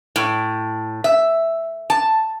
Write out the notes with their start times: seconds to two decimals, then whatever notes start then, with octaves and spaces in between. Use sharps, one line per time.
0.16 A2
1.04 E5
1.90 A5